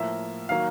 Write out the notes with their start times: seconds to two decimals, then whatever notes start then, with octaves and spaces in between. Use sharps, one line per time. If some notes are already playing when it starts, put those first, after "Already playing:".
Already playing: A2 F3 A#3 E5
0.49 D#3 F#3 A#3 F5